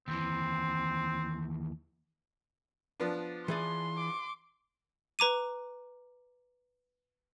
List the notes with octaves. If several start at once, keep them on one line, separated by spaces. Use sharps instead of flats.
D#2 E3 C4
F3 B3 D4
E3 G#4 D5 C6
D6
B4 A#5 D6 D#7